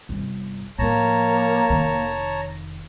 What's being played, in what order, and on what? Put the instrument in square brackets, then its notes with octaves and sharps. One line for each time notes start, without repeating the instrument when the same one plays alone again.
[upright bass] G1 C3
[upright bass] A2 F3 [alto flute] A#3 [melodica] C#5 A5 A#5
[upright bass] F1 D#3